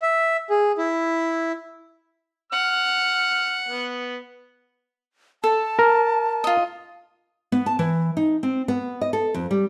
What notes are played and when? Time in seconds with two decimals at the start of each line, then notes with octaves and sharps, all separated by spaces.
0.02 E5
0.50 G#4
0.78 E4
2.52 F#5 F6
3.68 B3
5.44 A4 A5
5.79 A#4
6.44 F4 D#5
7.52 B3
7.66 A5
7.79 E3
8.17 D#4
8.43 C4
8.68 B3
9.01 D#5
9.13 A4
9.34 F2
9.51 G3